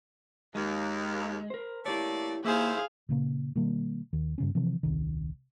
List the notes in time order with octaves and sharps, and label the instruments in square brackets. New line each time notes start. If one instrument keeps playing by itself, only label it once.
[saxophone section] D#2 [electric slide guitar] G#3
[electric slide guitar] A#4 C5
[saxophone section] A3 A#3 D5 [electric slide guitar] E4 G4 C#5
[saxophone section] D#2 E4 C5 [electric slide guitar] A#3 [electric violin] G#4 F5
[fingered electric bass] A#2 C#3 A#3
B2 D#3 G3 A#3
D#2 D#3
G2 C#3 C#4
C3 E3 F3
D#1 C2 D#3